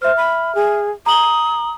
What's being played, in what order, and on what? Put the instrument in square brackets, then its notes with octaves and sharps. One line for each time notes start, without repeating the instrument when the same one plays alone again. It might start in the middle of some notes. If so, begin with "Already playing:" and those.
[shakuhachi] C5 [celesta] E5 F6
[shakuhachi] B5
G#4
[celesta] A#5 F#7 G7 [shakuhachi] D#6